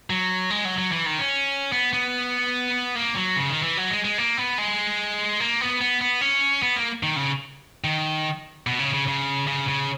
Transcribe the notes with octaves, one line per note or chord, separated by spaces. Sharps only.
F#3
G#3
F#3
F#3
E3
D#3
C#4
B3
B3
A#3
F#3
C#3
D#3
E3
F#3
G#3
G#3
A#3
B3
G#3
A#3
B3
B3
B3
C#4
B3
A#3
D#3
C#3
D#3
B2
C#3
C#3
C#3
C#3
C#3